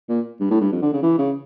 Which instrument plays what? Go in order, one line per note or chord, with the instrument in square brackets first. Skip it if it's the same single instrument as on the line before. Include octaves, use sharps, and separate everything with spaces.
[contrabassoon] A#2
G2
A2
G2
F2
D3
C#3
E3
C#3